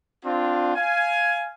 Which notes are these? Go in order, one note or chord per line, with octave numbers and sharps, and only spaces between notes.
C4 D4 F4
F5 G#5